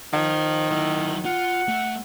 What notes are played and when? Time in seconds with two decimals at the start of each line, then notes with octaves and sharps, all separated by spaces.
0.13 D#3 C5 F5
0.71 F#3 E4
1.25 F4 F#5
1.68 A3